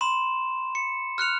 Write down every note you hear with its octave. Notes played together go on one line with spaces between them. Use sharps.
B5 C6 E7
C#7
F6 F#6 C#7 F7